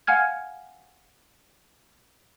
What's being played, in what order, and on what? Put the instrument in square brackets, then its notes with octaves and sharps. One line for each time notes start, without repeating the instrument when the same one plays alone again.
[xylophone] F5 F#5 G#5 F6 G#6